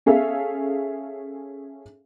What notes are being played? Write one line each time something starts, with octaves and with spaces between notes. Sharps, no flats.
C#4 G#4 A4 E5 F5